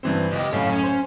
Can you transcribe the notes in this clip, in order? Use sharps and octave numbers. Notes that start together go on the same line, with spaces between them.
G2 E3 C4
C#2 G4 D#5
F#2 A2 C#5 F5
C#4
C5